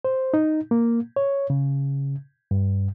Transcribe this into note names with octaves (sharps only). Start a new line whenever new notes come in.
C5
D#4
A#3
C#5
C#3
G2